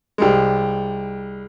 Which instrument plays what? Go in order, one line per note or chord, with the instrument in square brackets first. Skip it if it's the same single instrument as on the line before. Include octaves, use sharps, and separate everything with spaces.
[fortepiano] C2 G3 G#3